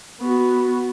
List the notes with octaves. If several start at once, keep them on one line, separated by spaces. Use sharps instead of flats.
B3 F#4